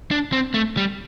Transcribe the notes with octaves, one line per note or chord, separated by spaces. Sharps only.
D4
C4
A3
G3